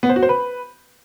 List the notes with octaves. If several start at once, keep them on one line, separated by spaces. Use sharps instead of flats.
B3
C5
F#4
C5
B4